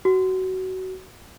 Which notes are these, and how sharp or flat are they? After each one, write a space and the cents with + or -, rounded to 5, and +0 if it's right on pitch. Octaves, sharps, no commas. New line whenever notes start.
F#4 +20